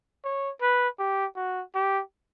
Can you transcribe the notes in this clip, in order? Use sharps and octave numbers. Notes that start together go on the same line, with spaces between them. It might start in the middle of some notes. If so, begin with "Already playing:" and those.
C#5
B4
G4
F#4
G4